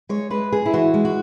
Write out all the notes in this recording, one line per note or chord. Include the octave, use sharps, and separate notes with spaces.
G#3 C#5
G#3 B4
G#3 G#4
E4
E3 F#4
G#3
F#4